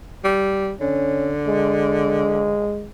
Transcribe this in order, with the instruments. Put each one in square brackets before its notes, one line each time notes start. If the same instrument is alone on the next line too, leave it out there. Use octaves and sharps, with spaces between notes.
[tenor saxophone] G3
[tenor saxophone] D3 [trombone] C#4
[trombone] G#3